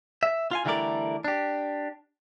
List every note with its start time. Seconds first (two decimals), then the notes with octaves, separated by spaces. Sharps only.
0.23 E5
0.51 F4 F5 G#5
0.65 D3 E3 G3 A3 A#4 D5
1.24 D4 G4